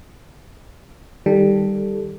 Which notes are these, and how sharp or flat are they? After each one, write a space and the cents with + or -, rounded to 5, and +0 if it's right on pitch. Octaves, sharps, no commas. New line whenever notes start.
D#3 +0 G3 +10 A4 +0